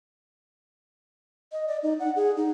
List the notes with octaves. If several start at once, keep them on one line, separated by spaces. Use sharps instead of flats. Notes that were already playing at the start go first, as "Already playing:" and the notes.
D#5
D5
D#4
F#5
G#4
D#4